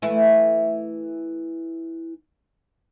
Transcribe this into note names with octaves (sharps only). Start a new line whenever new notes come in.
E3 A3 E4